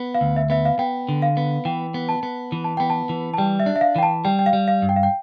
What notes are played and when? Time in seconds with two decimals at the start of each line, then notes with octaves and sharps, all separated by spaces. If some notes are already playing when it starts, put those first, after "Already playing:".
Already playing: B3
0.14 F5
0.21 D2
0.36 E5
0.50 B3 E5
0.65 F5
0.79 B3 G5
1.09 D3
1.22 F5
1.37 B3
1.65 E3 G5
1.94 B3
2.09 A5
2.23 B3
2.52 E3
2.64 A5
2.77 B3 G5
2.90 A5
3.09 E3
3.33 A5
3.38 G3 G5
3.60 E5
3.66 D4
3.76 E5
3.81 F5
3.96 E3 G5
4.03 A5
4.25 G3 G5
4.39 G5
4.46 F5
4.53 G3
4.68 F5
4.82 G2
4.89 G5
4.96 F5
5.03 G5